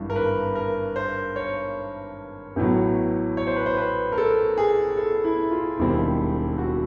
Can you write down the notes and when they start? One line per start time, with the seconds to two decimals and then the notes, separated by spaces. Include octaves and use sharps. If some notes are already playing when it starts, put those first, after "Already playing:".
Already playing: G#1 G2 E3
0.10 A#4
0.16 B4
0.55 A#4
0.96 C5
1.36 C#5
2.56 A1 A2 F#3 B3
3.37 C#5
3.47 C5
3.56 B4
3.66 C5
3.77 B4
4.12 A#4
4.18 A4
4.58 G#4
4.97 A4
5.24 E4
5.51 F4
5.78 E1 D#2 D#3 G3 C4 E4
6.58 F#4